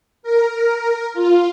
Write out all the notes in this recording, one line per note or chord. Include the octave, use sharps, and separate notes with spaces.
A#4
F4